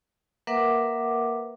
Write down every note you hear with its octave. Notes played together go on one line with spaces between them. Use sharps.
A#3 A#4 B4 E5 F#5 D6